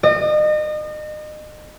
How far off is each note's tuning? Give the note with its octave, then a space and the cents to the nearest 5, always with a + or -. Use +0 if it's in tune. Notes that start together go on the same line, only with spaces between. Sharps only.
D#5 -35